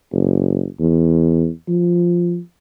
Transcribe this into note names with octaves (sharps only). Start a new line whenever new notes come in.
F#1
E2
F3